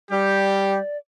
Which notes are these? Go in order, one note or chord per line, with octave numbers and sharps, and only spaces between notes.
G3 G4 D5